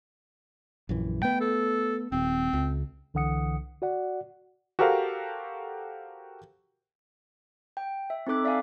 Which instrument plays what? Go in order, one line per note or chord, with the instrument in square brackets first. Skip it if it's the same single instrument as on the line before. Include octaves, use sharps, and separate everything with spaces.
[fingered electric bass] A#1 F#2 E3
[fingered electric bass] A3 B3 [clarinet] G5
[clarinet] A4
[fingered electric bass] D#1 [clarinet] C4
[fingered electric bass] C#2
[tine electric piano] C2 D3 E3 F#5 D#6 C#7
F#4 D5 F#5
[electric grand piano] F#4 G4 A4 A#4 C5 F5
[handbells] G5
E5
C4 D#4 A4 D6 F#6
D5 E5 F5 G#5